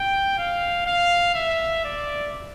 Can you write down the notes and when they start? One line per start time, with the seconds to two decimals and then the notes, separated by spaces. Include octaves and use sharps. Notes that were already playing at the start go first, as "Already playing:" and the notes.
Already playing: G5
0.38 F5
0.87 F5
1.35 E5
1.84 D5